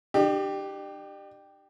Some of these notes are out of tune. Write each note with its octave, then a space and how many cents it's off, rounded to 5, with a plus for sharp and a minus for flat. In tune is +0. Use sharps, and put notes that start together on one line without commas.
D4 +45 G4 +0